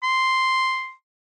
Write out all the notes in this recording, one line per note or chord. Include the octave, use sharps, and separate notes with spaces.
C6